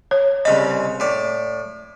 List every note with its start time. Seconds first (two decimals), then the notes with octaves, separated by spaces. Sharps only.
0.11 C#5
0.45 C2 C#3 D#5 B5
1.00 A2 D5